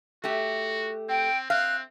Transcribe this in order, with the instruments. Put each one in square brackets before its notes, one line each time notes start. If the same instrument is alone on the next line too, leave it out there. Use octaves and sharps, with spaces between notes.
[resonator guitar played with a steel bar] A3 G4 [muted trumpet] F#4
[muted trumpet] C4 [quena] G5
[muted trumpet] C4 [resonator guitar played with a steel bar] F5 [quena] F#6